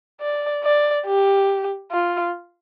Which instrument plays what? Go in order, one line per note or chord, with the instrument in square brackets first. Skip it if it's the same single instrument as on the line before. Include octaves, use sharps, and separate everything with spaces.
[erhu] D5
D5
G4
F4